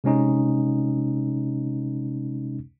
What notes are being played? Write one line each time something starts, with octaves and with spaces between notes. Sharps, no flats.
C3 G#3 C#4 D#4